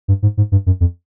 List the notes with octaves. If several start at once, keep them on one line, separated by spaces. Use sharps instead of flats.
G2
G#2
G#2
G2
F#2
F2